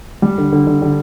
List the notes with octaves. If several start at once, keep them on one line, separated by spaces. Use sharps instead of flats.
G3
D3
D3
D3
D3